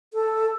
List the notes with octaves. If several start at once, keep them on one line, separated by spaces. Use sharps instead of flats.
A4